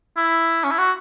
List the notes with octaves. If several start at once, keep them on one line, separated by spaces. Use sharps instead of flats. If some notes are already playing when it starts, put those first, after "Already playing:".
E4
C#4
E4
F#4